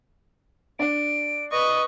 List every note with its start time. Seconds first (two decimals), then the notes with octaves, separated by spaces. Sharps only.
0.79 D4 D5 D7
1.52 B4 D#5 C#6